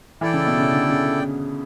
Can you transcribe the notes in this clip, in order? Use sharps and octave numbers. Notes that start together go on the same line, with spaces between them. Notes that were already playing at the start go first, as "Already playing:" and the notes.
E3 E4 A4 D5 G5
C#3
B2
C#3
D3
C#3